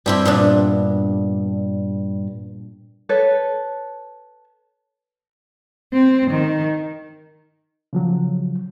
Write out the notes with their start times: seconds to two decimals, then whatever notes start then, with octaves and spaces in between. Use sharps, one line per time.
0.06 G2 C4 E4 G4
0.25 A#2 B3 D4
3.09 A4 B4 C#5
5.94 C4
6.31 D#3
7.93 C#3 F3 F#3